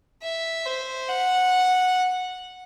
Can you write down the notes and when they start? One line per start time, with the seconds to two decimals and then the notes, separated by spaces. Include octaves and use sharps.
0.23 E5
0.66 C5
1.09 F#5